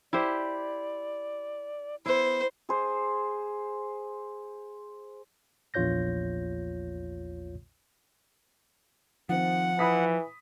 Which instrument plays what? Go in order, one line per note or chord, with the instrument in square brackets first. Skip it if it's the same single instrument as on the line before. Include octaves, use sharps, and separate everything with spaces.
[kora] E4 G4 C5 [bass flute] D5
[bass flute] B3 [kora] E4 [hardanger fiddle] C5
[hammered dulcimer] G#4 C5
[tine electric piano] A#1 E2 F4 C#5 G6 A#6
[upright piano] D#3 C4 [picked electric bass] F3 [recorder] F#5
[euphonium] E3 [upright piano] B5 D#6 B6